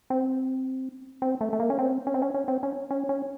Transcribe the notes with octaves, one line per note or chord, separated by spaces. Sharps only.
C4
C4
A3
A3
A#3
C#4
C4
C#4
C4
C#4
C#4
C4
C#4
C#4
C#4